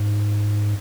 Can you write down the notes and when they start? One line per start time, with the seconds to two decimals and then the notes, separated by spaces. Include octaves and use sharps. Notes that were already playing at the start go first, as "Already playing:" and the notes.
Already playing: G#2